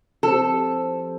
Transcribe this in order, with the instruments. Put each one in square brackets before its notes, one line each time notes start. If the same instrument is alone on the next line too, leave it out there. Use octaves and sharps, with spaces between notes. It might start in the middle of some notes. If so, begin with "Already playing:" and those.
[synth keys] F3 C4 E4 G4 C5 [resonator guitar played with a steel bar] A4